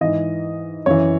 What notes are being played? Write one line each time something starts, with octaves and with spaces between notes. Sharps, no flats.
G#2 E3 D#5
F#2 E3 C#5